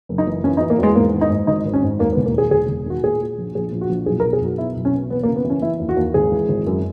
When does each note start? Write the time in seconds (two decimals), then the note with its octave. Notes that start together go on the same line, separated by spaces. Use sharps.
0.09 F#1
0.18 D#4
0.27 E3
0.44 E3 C#4
0.57 D#4
0.61 E3
0.70 A#3
0.79 E2 G#3
0.95 G#2 A#3
1.13 D#3
1.21 D#4
1.30 G#2
1.47 G#1 D#4
1.65 G#1
1.74 C#4
1.83 G#2
1.99 D#2 A#3
2.13 B3
2.17 E1
2.26 A#3
2.34 D#3 G#4
2.51 E1 G#4
2.68 E1
2.86 D#3 F#4
3.03 A#2 G#4
3.20 A#2
3.38 A#1
3.55 A#1 G#4
3.72 A#1
3.81 F#4
3.90 A#1
4.06 B1 G#4
4.20 A#4
4.24 B2
4.33 G#4
4.41 B1 F#4
4.58 B2 E4
4.76 B1
4.85 C#4
4.93 B2
5.10 E3 B3
5.23 A#3
5.28 C#3
5.36 B3
5.45 E3
5.50 C#4
5.62 E3 E4
5.80 D#2
5.89 F#4
5.97 D#2
6.14 G#1 G#4
6.32 E3
6.49 G#1
6.66 F#2